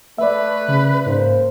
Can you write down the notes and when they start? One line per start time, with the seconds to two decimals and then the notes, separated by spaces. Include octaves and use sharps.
0.18 A3 B4 D5 E5
0.68 C#3
1.06 G#2 A#3 C#4 C5